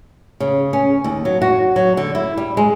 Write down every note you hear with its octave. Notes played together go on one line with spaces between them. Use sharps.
C#3
C#4
D#2
F#3
F#4
F#3
D3
E4
G3
G#3